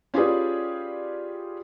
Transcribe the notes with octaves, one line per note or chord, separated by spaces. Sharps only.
C#4 F4 G4 G#4 B4 D5